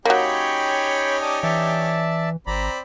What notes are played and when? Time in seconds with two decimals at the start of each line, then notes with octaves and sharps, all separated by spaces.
0.05 F#3 A#3 C#4 D#4 G4 C#5 G5 B5
1.22 D5 A5 D#6
1.43 E3 D5 E5 A5
2.47 G#1 C4 D5 A#5 B5